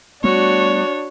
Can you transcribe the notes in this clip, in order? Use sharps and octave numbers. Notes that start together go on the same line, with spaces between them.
G3 A3 B3 D4 F#4 C#5